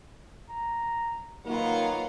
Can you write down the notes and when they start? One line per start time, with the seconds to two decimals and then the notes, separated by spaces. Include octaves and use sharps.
0.49 A#5
1.46 D#3 F#3 A#3 F4 B4 F#5